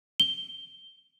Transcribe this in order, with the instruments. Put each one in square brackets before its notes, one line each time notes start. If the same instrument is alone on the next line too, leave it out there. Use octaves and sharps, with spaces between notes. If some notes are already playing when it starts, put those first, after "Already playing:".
[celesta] G7